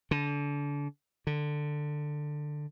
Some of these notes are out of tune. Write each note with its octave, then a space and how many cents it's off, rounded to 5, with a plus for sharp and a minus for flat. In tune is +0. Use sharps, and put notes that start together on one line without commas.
D3 -30
D3 +15